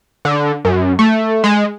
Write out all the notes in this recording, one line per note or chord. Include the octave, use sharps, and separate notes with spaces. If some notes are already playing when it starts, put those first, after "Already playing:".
D3
F#2
A3
G#3